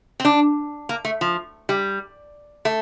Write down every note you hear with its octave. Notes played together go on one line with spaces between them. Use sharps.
C4
D4
A#3
A3
F3
G3
A3